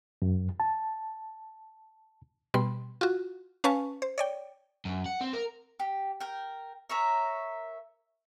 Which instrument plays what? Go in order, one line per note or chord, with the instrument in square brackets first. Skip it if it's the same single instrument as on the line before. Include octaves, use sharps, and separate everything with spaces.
[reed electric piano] F#2
A5
[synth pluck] B2 G3 B5 C6
F4 F#4
C#4 B4 F5 G#5 A5 C#6
C5
C#5 D5 G5
[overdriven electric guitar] F#2
F#5
C4
A#4
[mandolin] G4
A#4 G5
A#4 C#5 E5 A#5